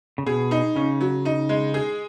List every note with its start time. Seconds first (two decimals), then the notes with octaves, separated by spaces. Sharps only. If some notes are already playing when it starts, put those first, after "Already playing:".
0.18 C#3
0.26 B2 G#4
0.51 D#4
0.76 C#3 C#4
1.01 F#3
1.25 D#4
1.49 G#3
1.74 G#4